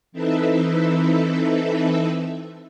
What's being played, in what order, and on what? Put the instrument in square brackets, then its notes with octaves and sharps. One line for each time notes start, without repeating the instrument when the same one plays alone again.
[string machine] E3 C4 D#4 A4 B4 E5